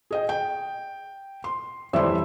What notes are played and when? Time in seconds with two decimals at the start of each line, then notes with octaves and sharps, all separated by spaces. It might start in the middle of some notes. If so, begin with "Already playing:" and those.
0.11 G#4 D#5 G5
0.29 G5
1.44 C6
1.93 F2 E3 G3 E5 C6